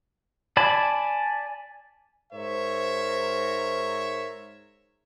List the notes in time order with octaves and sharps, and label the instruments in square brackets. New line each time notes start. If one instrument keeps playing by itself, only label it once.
[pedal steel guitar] D5 G#5 A5 B5
[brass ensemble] G#2 A#4 C5 C#5 E5